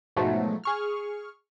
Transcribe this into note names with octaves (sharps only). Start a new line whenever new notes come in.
G#2 B2 F3 F#3 A3
G#4 C#6 F6